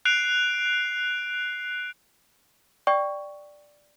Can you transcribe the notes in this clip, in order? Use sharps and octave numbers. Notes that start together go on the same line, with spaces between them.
F#6 C7 D7 F7
D5 G5 C#6